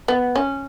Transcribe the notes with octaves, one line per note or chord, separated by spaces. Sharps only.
B3
C#4